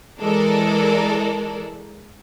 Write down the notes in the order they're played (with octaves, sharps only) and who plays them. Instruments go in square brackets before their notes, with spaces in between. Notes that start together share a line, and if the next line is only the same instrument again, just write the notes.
[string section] E3 G#3 A4 A#4 D5